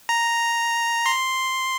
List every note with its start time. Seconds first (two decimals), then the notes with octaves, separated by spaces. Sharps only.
0.09 A#5
1.06 C6